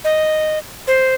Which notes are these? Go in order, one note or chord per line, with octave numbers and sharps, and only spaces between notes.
D#5
C5